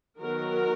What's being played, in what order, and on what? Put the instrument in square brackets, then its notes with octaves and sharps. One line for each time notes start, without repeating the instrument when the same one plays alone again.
[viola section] D#3 F#3 B3 F#4 A#4